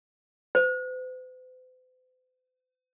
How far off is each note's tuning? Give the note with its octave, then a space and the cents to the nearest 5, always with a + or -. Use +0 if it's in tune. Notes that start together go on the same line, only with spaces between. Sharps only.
C5 -45